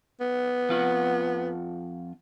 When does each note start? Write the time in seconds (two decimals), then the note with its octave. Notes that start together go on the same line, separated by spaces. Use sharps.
0.21 B3
0.69 F2 F4 F#5